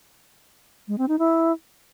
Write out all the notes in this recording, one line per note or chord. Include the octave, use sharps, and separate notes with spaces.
G#3
C4
D#4
E4